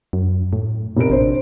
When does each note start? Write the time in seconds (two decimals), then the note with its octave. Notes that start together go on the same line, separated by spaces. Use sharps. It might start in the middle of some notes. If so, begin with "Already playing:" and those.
0.13 F#2
0.53 A2
0.97 F1 A#4 D7
1.10 A1 D4 C5